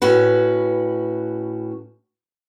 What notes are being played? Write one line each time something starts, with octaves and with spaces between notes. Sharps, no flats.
A2 C#4 F#4 B4